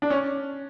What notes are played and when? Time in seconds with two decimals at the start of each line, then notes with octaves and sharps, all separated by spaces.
0.02 D4
0.10 C#4